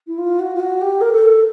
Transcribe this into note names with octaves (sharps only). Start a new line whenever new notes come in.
E4
F4
F#4
F4
F#4
G4
A#4
A4